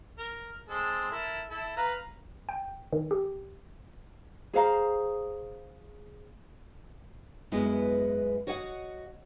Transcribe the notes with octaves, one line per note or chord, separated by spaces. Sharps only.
A#4
G#3 C4 A4
E4 A4 A#4
E4 A4
B4 F5 A#5
G5
D#3
G4
G#4 C5 F5 A#5
F#2 G#3 B3 E4 F#4 B4
F#4 C#5 D#5 F5 F#5